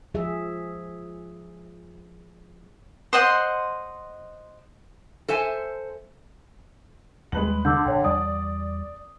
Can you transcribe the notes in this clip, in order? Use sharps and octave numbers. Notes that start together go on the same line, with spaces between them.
F3 G#4 E5
C5 D#5 F#5 C6
A4 C5 E5 G#5
D#2 G3 G#3 B4 F#7
D3 D6 E6 G6
A#1 G#2 C#5 G5
E2 G3 D5 D#6